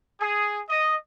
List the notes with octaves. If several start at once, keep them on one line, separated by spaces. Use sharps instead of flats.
G#4
D#5